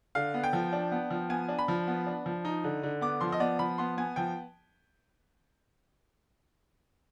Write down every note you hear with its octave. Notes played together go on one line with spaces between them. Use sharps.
D3 F5
B3
G5
F3
D4
B3
F3
B3 G#5
D4
B5
F3
B3
D4
F3
D#4
D3
D3
B3 D6
F3 C6
D#5
B3 D5
F3 B5
B3 C6
B3 G#5
F3 G5